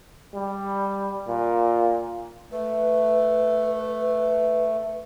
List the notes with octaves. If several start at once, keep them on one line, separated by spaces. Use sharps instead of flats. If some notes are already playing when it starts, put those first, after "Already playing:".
G3
A#2
A3 B4